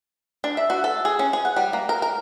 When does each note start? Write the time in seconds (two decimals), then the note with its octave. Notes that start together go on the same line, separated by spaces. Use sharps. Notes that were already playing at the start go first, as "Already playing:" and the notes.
0.44 D4
0.57 E5
0.70 F#4
0.84 A4
1.05 G#4
1.19 C#4
1.33 G#4
1.45 F#5
1.56 G3
1.73 A#3
1.89 A#4
2.02 A#4